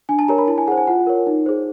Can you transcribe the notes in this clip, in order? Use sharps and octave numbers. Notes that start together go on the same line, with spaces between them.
D4 G#5
A5
G4 A#4 C#5 A#5
B5
E4 A5
G#5
G#4 C5 F#5
G#5
F4 F#5
A#4 C#5
D#4
G#4 C5